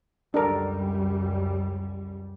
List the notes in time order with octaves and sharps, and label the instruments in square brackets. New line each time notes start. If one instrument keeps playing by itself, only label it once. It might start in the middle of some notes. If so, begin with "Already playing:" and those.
[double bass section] C#2 F#2 G3 [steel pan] D4 A4 A#4